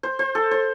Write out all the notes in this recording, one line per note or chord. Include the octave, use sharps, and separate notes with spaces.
C5
C5
A4
C5